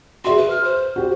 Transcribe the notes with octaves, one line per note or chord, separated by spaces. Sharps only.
F#4 G#4 E5 C6
B4
F6
C5
F#4 G4